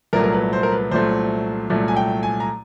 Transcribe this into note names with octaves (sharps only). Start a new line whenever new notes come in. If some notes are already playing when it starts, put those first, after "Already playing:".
C2 A#2 F#3 A3 A#4
A#4
B4
C5
A#4
B4
C2 A#2 F#3 A3 C5
C2 A#2 F#3 A3
G#5
G5
G#5
A#5